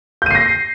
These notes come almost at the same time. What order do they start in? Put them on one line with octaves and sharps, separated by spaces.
G6 D#7 C7 A#6